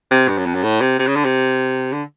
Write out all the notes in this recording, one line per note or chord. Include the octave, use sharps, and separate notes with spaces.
C3
G2
F#2
F2
F#2
A2
C3
C3
C#3
D3
C3
D3